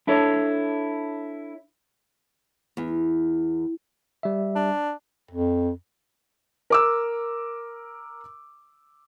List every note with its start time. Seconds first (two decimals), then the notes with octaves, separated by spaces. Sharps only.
0.07 D4 E4 A4 C#5
2.77 E2
4.23 G3 E5
4.55 D4
5.31 F2
6.70 A#4 D6 E6